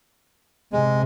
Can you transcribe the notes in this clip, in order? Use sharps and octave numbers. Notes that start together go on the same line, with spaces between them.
C3 G#3